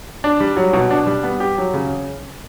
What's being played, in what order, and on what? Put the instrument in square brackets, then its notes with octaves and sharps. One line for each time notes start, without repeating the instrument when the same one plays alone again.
[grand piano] D4
G3
F#3
B2
D4
G3
B3
G4
F#3
C#3